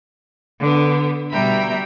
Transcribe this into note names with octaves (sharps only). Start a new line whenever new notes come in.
D3 B3
B2 G3 E5 G5 A#5 B5